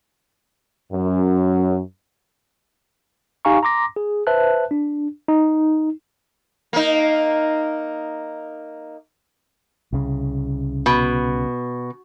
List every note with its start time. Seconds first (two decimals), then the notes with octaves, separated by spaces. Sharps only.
0.91 F#2
3.45 D#4 G4 F5 G#5 A#5 C#6
3.63 A#5 C6 D6 A#6
3.96 G#4
4.27 B4 C5 E5 A5 F#6
4.71 D4
5.29 D#4
6.73 A#3 D#4
9.93 C2 C#3
10.86 B2